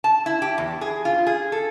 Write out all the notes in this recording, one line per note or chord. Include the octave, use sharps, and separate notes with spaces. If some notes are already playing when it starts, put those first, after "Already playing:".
A5
E4
G4
E2
G#4
F4
G#4
A4